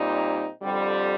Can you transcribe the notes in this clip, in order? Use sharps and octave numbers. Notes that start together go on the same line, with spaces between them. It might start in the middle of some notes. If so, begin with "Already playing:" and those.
Already playing: A#2 G3 C4 D#4
F2 D3 G3